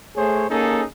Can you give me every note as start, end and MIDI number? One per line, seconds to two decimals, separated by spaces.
0.16 0.47 57
0.16 0.47 68
0.16 0.47 72
0.16 0.47 73
0.50 0.83 58
0.50 0.83 61
0.50 0.83 63
0.50 0.83 68
0.50 0.83 69